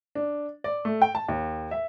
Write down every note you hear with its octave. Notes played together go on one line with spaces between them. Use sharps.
D4
D5
A3
G5
A5
D#2
E5